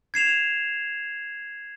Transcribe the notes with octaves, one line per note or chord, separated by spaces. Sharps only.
G#6 C7 E7 F7